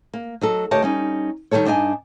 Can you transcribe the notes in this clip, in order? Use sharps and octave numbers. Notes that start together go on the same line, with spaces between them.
A#3
F#3 D#4 A4
D2 G4 A#4 C#5 D#5 A5
G3 C#4 D#4
D#3 E3 G3 A4 C#5
G2 D4 D#4 D#5 G#5